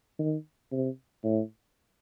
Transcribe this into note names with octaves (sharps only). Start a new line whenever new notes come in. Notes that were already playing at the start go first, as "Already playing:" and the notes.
D#3
C3
A2